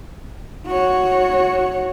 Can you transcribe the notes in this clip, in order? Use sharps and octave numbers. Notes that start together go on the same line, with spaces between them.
F#4 C#5